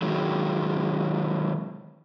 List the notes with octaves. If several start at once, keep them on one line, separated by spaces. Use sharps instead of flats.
D#3 F#3 G#3